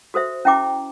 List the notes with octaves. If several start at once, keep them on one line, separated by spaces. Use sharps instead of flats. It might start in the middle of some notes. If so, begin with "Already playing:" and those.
F#4 A4 C5 E5
C#4 E4 E5 G5 A#5 D6